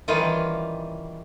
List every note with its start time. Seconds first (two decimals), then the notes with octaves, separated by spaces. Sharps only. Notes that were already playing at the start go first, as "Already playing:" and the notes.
0.08 D#3 E3 G3 C#4 F4